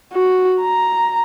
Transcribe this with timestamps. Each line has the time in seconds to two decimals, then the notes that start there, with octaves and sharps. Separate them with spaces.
0.13 F#4
0.61 A#5